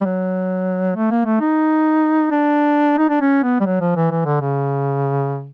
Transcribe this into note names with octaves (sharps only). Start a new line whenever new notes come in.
G3
F#3
A3
A#3
A3
D#4
D4
D#4
D4
C#4
B3
G3
F#3
F3
E3
E3
D3
C#3